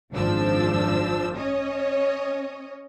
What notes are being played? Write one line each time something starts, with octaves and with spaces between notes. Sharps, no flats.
G#1 F#2 F3 D4 E6
C#4 C#5 D#5